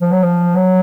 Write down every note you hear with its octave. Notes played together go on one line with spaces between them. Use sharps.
F3
F#3
F3
F#3